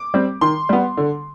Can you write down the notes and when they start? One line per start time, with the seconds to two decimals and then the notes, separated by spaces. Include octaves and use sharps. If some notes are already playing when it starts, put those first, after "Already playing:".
Already playing: D6
0.14 G3 C4
0.41 D#3 C6
0.69 G3 B3
0.97 D3